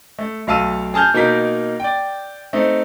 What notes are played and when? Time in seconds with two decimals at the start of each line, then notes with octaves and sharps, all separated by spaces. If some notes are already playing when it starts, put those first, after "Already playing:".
0.19 A3
0.47 B1 A3 F5 A5 E6 D#7
0.94 G#4 A5 F6 G6
1.14 B2 A#3 D#4 A#4 G6 B6
1.80 D5 G5
2.53 A3 C4 D#4